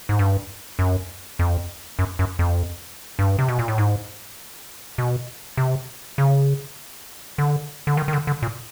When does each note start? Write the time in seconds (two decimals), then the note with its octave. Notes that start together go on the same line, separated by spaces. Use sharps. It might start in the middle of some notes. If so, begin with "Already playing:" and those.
0.09 G#2
0.19 G2
0.79 F#2
1.39 F2
1.99 F#2
2.19 F#2
2.39 F2
3.19 G2
3.39 C3
3.48 B2
3.59 A#2
3.68 A2
3.78 G#2
4.98 B2
5.57 C3
6.18 C#3
7.38 D3
7.87 D3
7.97 D#3
8.08 D#3
8.13 D3
8.27 D3
8.42 A#2